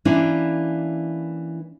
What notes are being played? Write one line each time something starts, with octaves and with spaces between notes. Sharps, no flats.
E3 A#3 C#4 D4 E4